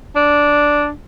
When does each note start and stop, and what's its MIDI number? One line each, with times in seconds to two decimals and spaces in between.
0.16 0.89 62